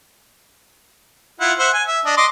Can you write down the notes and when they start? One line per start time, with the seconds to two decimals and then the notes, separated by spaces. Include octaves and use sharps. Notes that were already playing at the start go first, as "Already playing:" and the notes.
1.40 E4 F4 F#5
1.59 C5 E5 F#5
1.73 G#5
1.87 E5
2.05 D4 D#5
2.17 D#5 C6 D6